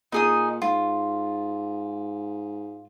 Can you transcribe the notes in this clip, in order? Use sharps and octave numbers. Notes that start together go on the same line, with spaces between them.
A#2 D#4 G#4 D#6
G#2 F4